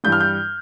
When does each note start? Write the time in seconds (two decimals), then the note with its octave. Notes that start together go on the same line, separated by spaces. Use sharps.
0.04 G2 E3 G3 G6
0.12 F6
0.20 G6